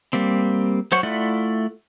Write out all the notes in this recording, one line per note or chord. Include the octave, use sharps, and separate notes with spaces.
G3 A#3 C4
F#3 C5 C#5 F#5
A3 E4 F4 D5 F#5